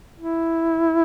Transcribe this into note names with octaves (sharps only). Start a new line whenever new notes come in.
E4